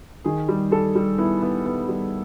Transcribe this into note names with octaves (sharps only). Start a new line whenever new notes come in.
D#3 G#4
G3
G3 A4
G3
B3 E4
B3
B3
G3